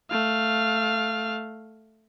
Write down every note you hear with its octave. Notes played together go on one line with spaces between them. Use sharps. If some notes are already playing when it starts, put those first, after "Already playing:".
A3 F5